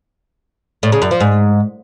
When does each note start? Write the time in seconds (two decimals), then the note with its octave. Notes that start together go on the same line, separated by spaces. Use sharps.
0.83 A2
0.92 C#3
1.02 F#2
1.11 F3
1.20 G#2